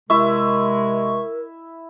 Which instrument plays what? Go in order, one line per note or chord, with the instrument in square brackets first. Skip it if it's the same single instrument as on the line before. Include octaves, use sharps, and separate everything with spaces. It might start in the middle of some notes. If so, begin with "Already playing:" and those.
[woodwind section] C3 G#3 [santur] E4 E5 [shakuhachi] A#4 [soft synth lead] C#6